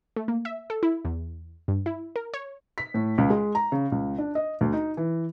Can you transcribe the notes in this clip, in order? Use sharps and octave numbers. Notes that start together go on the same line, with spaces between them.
A3
A#3
E5
A4
E4
E2
G2
E4
A#4
C#5
B6
A2
C#2
G#3
A#5
C#3
C#2
D4
D#5
D2
D#4
E3